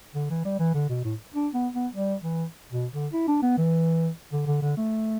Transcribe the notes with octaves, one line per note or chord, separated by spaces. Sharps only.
D3
E3
G3
E3
D3
B2
A2
D4
B3
B3
G3
E3
B2
D3
E4
D4
B3
E3
D3
D3
D3
A3